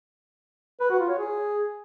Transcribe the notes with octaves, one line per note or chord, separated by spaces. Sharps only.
B4
F#4
F4
C#5
G#4